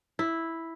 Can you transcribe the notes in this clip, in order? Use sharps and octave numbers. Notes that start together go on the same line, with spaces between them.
E4